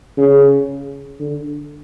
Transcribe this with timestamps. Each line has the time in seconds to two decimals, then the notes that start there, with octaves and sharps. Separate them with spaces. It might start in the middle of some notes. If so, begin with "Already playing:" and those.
0.17 C#3
1.19 D3